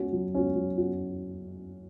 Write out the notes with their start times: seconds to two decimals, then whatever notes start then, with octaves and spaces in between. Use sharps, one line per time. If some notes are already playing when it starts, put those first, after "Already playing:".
Already playing: C#4 F#4
0.13 F#3
0.34 C#4 F#4
0.56 F#3
0.78 C#4 F#4